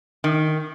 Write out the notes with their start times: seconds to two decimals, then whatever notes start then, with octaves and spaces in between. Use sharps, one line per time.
0.24 D#3